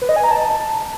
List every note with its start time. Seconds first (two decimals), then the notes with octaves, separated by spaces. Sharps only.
0.02 B4
0.09 D#5
0.16 G#5
0.24 A#5
0.31 A5